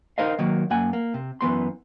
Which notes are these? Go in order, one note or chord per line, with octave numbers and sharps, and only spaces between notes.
D#4 A#4 C5 D#5 F5
D#3 F#3 A#3
F#2 A#3 F#5 G#5
A#3
C3
F#2 E3 B3 C6